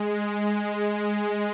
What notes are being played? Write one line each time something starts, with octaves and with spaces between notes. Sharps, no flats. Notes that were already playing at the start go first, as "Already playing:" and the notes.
Already playing: G#3